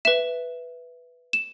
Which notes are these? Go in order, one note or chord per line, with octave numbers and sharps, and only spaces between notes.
B4 E5 E7
E7